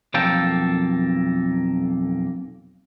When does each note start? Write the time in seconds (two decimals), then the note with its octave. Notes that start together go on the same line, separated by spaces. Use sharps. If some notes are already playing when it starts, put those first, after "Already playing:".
0.14 B1 F2 A#3 A4 G5